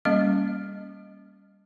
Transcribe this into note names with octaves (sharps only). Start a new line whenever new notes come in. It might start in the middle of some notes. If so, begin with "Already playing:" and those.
G3 A#3 C#4 D#5 F5